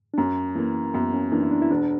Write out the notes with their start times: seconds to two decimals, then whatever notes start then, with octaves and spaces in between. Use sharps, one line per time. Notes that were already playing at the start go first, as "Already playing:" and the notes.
0.14 D4
0.18 F#2 C#4
0.55 E3 A#3
0.94 F#2 B3
1.13 C#4
1.32 E3 A#3 D4
1.42 E4
1.51 D4
1.62 E4
1.71 E1 D4